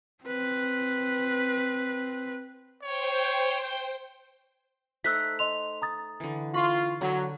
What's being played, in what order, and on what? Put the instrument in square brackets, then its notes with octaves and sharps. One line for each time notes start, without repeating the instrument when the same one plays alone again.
[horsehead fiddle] C4 B4
[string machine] C5 G5 [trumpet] C#5
[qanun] A3 D#4 C5 [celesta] E6 F#6 B6
[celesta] D#5 C6 F7
A#5 D#6 A6
[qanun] D3 E3
[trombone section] F4 [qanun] B5 [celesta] C#6
[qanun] D3 [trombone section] F#3 [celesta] A#5